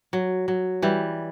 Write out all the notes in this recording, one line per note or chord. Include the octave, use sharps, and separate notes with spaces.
F#3
F#3
E3 G3